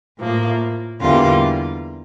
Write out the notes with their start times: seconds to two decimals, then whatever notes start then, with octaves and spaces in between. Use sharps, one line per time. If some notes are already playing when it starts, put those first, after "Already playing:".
0.18 A2 F3 A#3
1.01 E2 D3 G3 A#3 F4